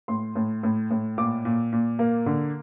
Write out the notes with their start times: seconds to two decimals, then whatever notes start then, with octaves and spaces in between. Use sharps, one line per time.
0.08 A2 C6
0.36 A2
0.63 A2
0.91 A2
1.18 A#2 D6
1.45 A#2
1.73 A#2
1.99 A#3
2.26 D3